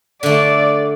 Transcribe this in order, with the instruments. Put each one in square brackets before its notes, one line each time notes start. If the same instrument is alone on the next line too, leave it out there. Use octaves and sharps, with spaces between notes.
[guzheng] D3 A3 [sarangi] D5